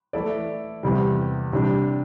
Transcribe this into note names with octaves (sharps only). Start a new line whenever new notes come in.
E3 A3 E4 A4 D5
E2 C3 G3
C3 G3 D4